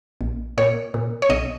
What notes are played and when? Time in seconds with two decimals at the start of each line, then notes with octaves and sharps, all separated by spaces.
0.21 A#1
0.58 A#2 C#5
0.94 A#2
1.22 C#5
1.29 B1 D#5